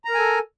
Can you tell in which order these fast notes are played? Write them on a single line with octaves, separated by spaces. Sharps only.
A#5 A#4 G#5 A4